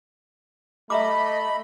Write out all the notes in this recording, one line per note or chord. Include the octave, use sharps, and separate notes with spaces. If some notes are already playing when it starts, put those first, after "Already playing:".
A3 D#5 E5 A#5 B5 D6